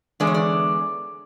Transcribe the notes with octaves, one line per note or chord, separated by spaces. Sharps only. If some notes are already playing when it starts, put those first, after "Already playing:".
E2 D3 G#3 D5
C#5
D5